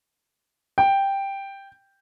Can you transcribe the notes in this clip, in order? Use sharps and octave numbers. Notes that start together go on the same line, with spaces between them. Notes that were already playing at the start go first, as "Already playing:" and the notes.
G5